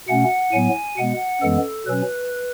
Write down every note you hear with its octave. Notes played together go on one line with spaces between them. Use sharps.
B2 A3 C#4 F#5
A2 F#3 B3 G#5
B2 G#3 B3 F#5
F#2 E3 G#3 B3 A4
B2 F#3 C#4 B4